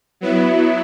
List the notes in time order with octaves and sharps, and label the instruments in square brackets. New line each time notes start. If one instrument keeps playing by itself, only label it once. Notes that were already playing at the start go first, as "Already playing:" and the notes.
[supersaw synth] F#3 B3 E4